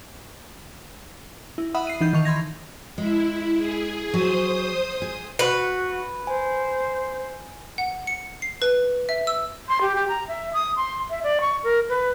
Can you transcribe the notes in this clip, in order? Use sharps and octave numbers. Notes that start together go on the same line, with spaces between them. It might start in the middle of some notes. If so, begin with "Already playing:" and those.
E4
E5 F#5 B5 D#6
C7 D#7
E3 D#4 G6
D#3 C#6 F7
B5 C6 G#6 A#6
G#3 E4
G#4
F#3 G#4 C5 D#6
G#4
F#4 B4
C5 G#5
F#5
C#7
C7
B4
E5
E6
C6
G4
G4
A#5
E5
D#6
C6
E5
D5
C#6
A#4
B4